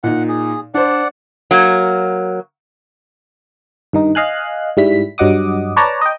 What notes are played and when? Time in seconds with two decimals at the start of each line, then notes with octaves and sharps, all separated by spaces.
0.03 A#2 D#4 F#5
0.29 G#4
0.74 D4 C5 D5 F#5
1.51 F#3 A#3
3.93 G2 D#3 D#4
4.15 D#5 F5 G#5 F#6
4.77 G#2 G3 E4 B6
5.18 G2 F#3 D#5 F#5 D6 D#6
5.77 B4 C#5 D5 A5 A#5
6.01 D#5 G5